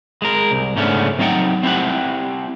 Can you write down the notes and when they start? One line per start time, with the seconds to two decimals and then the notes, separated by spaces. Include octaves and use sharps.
0.22 G#3 A#4
0.51 C2
0.76 G#2 C#3 A3 B3 C#4 D4
1.19 F#3 C4 D#4 D#5 F#5 G5
1.63 C4 E4 G4 F#5